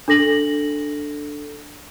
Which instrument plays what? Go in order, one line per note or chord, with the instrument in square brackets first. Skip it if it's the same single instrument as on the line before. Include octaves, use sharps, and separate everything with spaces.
[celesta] D4 A4 A#6 F#7